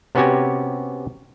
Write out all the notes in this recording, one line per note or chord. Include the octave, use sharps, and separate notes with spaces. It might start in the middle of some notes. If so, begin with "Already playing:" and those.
C3 B3 C#4 F#4 G4 G#5